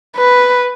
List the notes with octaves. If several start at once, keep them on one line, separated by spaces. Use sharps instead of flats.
B4